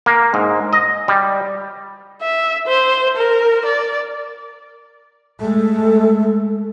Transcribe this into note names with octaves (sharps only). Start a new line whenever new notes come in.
A#3
G#2
D#5
G3
E5
C5
A#4
D5
G#3 A3 A4